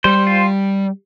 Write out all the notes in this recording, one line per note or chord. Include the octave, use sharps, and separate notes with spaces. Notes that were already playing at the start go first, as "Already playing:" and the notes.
G3 C5
F4